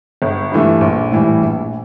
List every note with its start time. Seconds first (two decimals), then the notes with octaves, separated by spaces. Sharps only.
0.22 G1
0.52 G2 E3 A3
0.81 A#1
1.12 A2 E3 G3
1.41 A#1